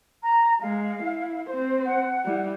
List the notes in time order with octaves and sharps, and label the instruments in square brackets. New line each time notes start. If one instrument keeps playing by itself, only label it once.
[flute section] A#5
[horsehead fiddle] G#3 [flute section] F5
[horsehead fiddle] E4
C4 C5
[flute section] F#5
[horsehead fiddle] G3 E4